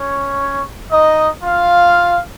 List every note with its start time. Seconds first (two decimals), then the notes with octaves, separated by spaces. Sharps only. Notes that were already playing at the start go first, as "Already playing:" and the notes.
Already playing: C#4 C#5
0.92 D#4 D#5
1.44 F4 F5